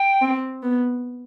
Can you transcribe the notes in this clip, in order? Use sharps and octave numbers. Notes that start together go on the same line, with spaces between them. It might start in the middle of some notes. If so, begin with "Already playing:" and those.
Already playing: G5
C4
B3